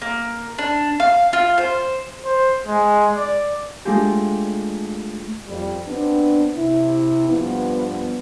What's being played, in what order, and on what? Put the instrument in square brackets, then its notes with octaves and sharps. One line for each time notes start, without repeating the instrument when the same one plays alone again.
[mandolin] A#3
D4
F5
F4
C5
[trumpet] C5
G#3
D5
[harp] G#3 A3 D4 F4 G4
[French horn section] F2 G3
B3 C4 D4
C3 E4
G2 F3 B3